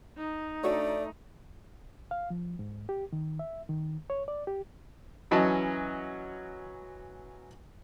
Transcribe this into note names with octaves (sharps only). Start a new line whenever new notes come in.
D#4
A3 D4 F#4 C#5 D5
F5
F3
G#2
G4
D#3
E5
D#3
C#5
D5
G4
E3 F#3 C#4 D#5 A5